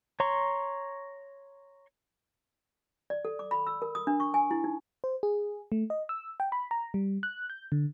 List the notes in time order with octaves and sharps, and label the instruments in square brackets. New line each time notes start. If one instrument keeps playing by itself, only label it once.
[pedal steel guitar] C#5 A#5 C6 C#6
[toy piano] D5
A4
D6
B5
E6
A#4
D#6
D4
C#6
G#5
E4
D#4
[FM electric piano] C5
G#4
A3
D#5
E6
G5
B5
A#5
G3
F#6
G6
D3